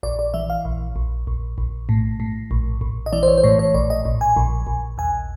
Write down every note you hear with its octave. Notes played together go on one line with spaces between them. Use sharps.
A#1 D5
D5
E3 E5
F5
A#1
A#1
A#1
A#1
A2
A2
A#1
A#1
D#5
E3 D5
C5
C#5
C5
A2 C#5
C#5
A#1 D5
D#5
A#1
G#5
A#1
A#1
D#2 G#5